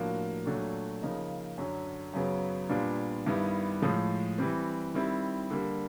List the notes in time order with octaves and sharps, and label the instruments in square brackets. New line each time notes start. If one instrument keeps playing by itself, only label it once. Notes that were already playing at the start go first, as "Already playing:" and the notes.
Already playing: [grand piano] A2 F3 A#3 D4 F#4
A#2 F#3 A3 D4 F#4
C#3 F3 A#3 D#4
F#2 D3 F#3
F#2 C#3 F#3 B3
A#2 G3 B3 D4 F4
G2 D#3 G3 B3 E4
A2 F3 G#3
E3 G3 C4
D#3 G3 C4 E4
D3 G3 A#3